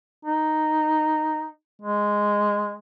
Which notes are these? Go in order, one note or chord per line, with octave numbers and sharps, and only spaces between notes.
D#4
G#3